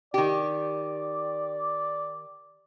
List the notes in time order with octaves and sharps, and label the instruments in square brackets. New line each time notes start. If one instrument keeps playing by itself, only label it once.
[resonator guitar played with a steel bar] D#3 G4 [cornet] D5